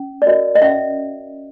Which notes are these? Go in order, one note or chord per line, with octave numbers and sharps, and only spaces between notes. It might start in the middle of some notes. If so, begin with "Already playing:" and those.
Already playing: C#4
D5
F#4 A#4 C#5 D#5
D#5
C#4 E5